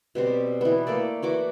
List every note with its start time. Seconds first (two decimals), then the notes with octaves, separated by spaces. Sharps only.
0.15 B2 G3 C4
0.61 E3 B3
0.87 A3 A#3 A4 D5
1.22 E3 F#4 D6